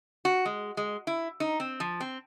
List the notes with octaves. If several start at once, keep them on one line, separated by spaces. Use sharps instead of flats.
F#4
G#3
G#3
E4
D#4
C4
F3
C4